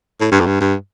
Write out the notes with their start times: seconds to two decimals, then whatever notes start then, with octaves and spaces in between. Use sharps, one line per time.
0.21 A2
0.32 G2
0.40 F2
0.46 G2
0.61 G2